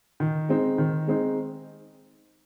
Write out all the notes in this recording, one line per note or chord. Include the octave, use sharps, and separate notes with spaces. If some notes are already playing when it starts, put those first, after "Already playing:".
D#3
G#3 C4 D#4
D#3
G#3 C4 D#4